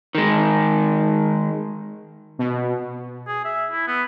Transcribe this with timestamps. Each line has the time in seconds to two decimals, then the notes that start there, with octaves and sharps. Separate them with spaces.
0.15 D#3 G#3
2.39 B2
3.27 G#4
3.45 E5
3.71 E4
3.87 B3